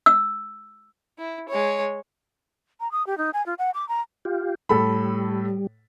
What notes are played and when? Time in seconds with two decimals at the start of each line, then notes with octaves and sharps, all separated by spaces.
0.06 E6
1.18 E4
1.48 G#3 C#5
2.80 A#5
2.92 D#6
3.07 G4
3.18 D#4
3.34 G#5
3.46 F4
3.59 F#5
3.74 D6
3.89 A#5
4.25 F4 G4
4.69 A2 G3 A4 B5